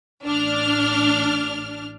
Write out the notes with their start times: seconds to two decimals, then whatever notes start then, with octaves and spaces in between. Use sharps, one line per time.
0.24 A1 D4 F6